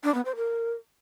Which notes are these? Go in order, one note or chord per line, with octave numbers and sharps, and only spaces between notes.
D4
B3
C5
A#4